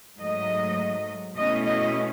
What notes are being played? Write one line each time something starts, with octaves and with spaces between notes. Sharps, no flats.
G#2 F#3 A3 D#5
B2 A3 C#4 E4 D#5
D#5